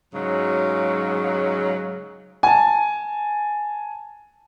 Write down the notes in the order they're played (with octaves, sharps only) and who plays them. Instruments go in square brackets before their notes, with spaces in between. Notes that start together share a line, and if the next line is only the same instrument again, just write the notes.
[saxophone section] G#2 C#3 F#3
[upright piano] G#5 A5